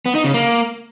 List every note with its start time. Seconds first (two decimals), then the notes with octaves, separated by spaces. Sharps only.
0.06 B3
0.15 D#4
0.25 C#3
0.34 A#3